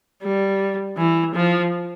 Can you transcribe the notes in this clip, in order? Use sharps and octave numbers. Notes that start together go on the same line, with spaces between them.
G3
E3
F3